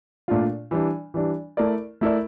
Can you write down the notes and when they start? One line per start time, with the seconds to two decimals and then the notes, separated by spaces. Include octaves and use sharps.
0.28 A#2 A3 D4 F4
0.71 E3 G3 D4
1.14 E3 G3 D4
1.57 A3 E4 A#4 D5
2.01 A3 E4 A#4 D5